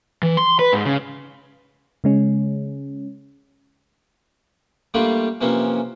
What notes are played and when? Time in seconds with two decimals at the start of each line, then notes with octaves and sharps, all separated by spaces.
0.23 E3
0.37 C6
0.59 B4
0.73 G#2
0.85 C#3
2.04 C#3 G#3 C#4
4.94 G3 A3 A#3 D4 F4 G4
5.41 C3 E3 F3 A#3 C#4